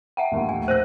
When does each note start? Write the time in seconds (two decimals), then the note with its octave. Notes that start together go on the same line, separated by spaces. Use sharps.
0.17 E5 F#5 G5
0.32 A#1 D#2 A2
0.49 G#5
0.68 C5 F#6 A#6 D#7